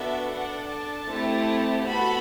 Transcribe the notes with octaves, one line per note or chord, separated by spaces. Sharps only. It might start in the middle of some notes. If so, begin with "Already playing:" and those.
Already playing: B3 D4 F#4 A4 E5
D4 A4 F#5
A5
A3 C4 E4 G4
B3 F#4 A4 B5